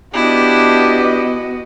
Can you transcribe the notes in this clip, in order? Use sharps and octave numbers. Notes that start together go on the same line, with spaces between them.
B3 D4 E4 F#4 G4 D#5